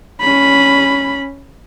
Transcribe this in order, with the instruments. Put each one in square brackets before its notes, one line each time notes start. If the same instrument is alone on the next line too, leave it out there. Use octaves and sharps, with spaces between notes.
[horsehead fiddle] C#4 B5